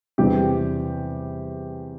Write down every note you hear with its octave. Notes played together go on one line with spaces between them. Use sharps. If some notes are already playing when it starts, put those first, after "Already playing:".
E2 C3 G3 G4